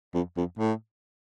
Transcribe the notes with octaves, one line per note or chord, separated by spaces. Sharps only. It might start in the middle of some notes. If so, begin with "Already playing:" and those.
F2
F2
A2